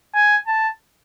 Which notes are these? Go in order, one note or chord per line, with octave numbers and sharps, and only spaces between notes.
G#5
A5